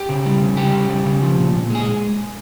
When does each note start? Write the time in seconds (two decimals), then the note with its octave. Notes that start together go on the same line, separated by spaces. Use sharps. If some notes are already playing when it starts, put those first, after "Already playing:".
Already playing: G4
0.09 C#3
0.26 G3
0.41 C#3
0.57 G3 G4
0.74 C#3
0.89 G3
1.05 C#3
1.21 F3
1.38 A#2
1.55 A#2
1.70 G#3 G#4